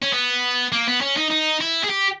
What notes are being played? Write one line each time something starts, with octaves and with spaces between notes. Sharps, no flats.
C#4
B3
A#3
B3
C#4
D#4
D#4
E4
G#4
G4